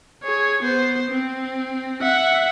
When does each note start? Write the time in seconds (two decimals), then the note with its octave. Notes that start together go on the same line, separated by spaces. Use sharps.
0.23 G#4 C#5
0.63 B3 C5
1.10 C4
2.02 E5 F#5